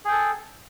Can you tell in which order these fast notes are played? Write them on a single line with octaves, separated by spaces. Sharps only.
G#4 G5 A4